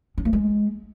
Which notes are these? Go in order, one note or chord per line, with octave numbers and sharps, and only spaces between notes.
C#4
A#3
G#3